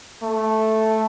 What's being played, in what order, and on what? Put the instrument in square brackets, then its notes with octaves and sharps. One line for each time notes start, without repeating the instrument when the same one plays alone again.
[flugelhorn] A3